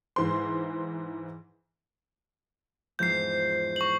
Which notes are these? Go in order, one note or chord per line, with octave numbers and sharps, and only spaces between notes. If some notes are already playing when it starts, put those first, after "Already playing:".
G#2 E3 C5 C6
E2 G#2 F3 G6 C7
C#6 F#7